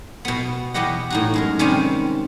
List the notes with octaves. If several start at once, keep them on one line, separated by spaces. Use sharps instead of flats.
B2 B3
E2 B2 B3 G4 D#5 F#5
A2 D#4 F#4
F#2 G#3 A#4
C3 D#3 G3 G#3 C4 C#4